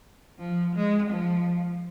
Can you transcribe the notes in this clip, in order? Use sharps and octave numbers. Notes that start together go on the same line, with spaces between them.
F3
G#3
F3